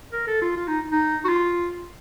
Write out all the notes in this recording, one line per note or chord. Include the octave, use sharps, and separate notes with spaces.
A#4
A4
F4
F4
D#4
D#4
F#4
F4